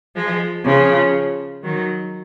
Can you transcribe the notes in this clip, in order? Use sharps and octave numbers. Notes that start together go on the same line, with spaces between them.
F3 G#3
C#3 F3
D#3 F#3